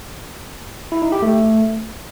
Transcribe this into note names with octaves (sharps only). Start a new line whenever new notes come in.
E4
D#4
G4
A3